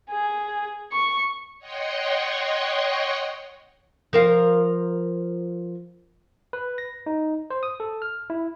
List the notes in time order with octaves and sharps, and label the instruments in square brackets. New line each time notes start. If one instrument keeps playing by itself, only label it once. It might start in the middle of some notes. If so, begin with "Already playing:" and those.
[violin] G#4
C#6
[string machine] C#5 D#5 F#5 G5 C6 C#6
[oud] F3 A#4 F5
[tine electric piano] B4
A#6
D#4
C5
D#6
A4
F6
E4